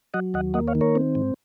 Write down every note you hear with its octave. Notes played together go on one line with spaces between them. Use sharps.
F#3 D#5 F#5
D#2 D#5 F#5
A#3 D#5 F#5
C#5 F5
D#3
A#4 C#5
C4
G#2